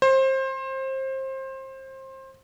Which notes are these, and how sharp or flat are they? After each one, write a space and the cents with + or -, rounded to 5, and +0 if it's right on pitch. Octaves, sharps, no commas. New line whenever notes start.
C5 +25